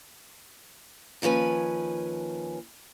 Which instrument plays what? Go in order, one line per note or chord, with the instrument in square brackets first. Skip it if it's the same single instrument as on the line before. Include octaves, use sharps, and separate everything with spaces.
[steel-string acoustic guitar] D#2 F3 C#4 B4 G#5